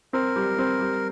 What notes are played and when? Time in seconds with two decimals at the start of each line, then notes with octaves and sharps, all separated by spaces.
0.13 C4 A#4
0.36 G3
0.58 C4
0.80 G3